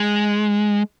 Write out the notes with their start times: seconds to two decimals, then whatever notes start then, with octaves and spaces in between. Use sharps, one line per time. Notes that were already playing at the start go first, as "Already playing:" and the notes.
Already playing: G#3